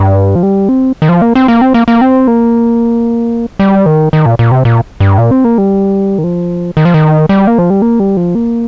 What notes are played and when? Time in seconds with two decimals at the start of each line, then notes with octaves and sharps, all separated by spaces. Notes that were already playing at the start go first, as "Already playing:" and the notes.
Already playing: G2
0.35 F3
0.43 G3
0.69 C4
1.02 D#3
1.09 F3
1.22 A#3
1.35 C4
1.48 A#3
1.61 C4
1.74 A#3
1.88 A#3
2.01 C4
2.28 A#3
3.59 G3
3.86 D#3
4.13 D#3
4.26 A#2
4.39 A#2
4.52 C3
4.65 A#2
5.00 G2
5.18 A#2
5.31 C4
5.44 A#3
5.58 G3
6.18 D#3
6.24 F3
6.77 D#3
6.85 F3
6.94 D#3
7.29 G3
7.47 A#3
7.58 F3
7.70 G3
7.82 A#3
8.00 G3
8.17 F3
8.35 A#3